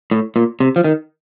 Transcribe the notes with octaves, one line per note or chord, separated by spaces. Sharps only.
A2
A#2
C3
F3
D#3